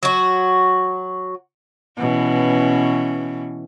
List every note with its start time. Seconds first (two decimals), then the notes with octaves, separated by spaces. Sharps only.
0.03 F#3 F#4
1.98 B2 E3 C#4